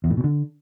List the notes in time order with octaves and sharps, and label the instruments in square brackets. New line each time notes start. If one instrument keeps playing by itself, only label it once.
[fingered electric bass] E2
A2
B2
D3